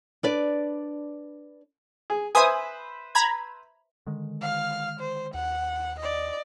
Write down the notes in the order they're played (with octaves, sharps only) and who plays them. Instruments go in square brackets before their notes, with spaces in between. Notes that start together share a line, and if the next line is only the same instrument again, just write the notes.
[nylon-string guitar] D4 B4 D5
[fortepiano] G#4
[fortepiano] B4 C5 E5 [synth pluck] G#5 D#6
[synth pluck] A#5 B5 G#6
[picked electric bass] D3 D#3 G#3
[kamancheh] F5 F6
C5
[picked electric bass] D#2 [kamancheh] F#5
[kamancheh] D5 D#5